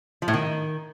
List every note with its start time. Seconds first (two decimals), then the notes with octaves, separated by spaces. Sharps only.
0.22 F3
0.28 A2
0.34 D#3